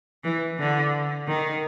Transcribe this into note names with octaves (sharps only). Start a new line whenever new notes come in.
E3
D3
D#3